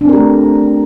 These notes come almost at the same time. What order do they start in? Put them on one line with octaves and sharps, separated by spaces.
D4 C4 A#4 G4 A3